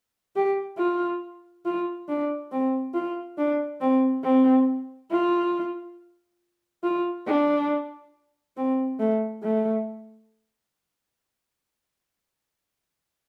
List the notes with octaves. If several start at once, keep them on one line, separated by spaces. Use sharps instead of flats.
G4
F4
F4
D4
C4
F4
D4
C4
C4
F4
F4
D4
C4
A3
A3